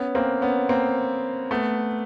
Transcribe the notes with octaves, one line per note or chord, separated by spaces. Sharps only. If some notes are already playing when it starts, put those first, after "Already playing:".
Already playing: B3 C#4
A#3 C4
B3 C#4
A#3 C4
A3 B3